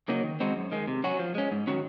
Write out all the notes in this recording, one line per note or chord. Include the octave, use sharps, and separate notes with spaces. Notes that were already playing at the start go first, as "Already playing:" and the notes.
C#3 F#3 A#3 D#4
D#3
G#3 C4 D#4 F#4
F#2
D#3 G#3
C3
F#3 C#4 F#4
F3
G#3 C#4
G#2
D#3 F#3 C#4 F#4